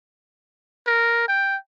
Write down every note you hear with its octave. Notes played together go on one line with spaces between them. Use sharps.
A#4
G5